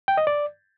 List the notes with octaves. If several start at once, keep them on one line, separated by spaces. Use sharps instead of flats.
G5
D#5
D5